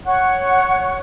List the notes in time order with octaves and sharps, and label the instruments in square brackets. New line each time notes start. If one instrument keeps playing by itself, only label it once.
[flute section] C#5 F#5 C#6 F#6